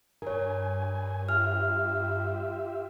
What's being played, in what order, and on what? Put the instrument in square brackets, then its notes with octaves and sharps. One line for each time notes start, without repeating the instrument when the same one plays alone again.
[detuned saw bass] G2 [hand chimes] A#4 C#5 [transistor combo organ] G#5
[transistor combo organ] F4 G4 E5 [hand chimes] F6